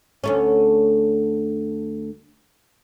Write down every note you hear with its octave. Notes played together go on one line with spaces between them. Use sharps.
D2 A3 C#4